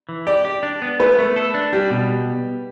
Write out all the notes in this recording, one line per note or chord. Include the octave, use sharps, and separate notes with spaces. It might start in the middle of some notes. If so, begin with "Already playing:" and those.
E3
G4 D5
G4
D4
B3
A3 B4
A3
A4
D4
G3 G4
B2